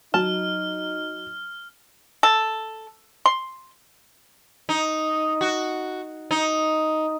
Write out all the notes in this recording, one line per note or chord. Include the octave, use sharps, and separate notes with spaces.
F#3 D#4 A5 F6
A4
C6
D#4
F#4
D#4